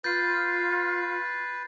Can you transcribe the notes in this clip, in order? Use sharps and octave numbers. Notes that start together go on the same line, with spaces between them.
F4 B4 G6 A6 C7